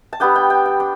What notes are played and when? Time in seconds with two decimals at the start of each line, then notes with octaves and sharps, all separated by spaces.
0.13 A5
0.20 G3 B3 D4 G5
0.35 G5
0.50 G5
0.66 G5
0.80 D4